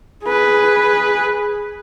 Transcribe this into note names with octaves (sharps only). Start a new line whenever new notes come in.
G#4 B4